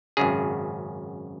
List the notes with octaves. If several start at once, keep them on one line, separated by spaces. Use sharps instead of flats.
G#1 F#2 C#3 G#4